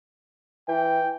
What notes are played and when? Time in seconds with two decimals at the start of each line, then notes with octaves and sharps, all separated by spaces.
0.68 E3 G5